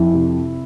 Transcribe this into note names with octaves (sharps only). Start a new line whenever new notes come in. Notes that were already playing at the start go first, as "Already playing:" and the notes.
Already playing: F2 E4
C3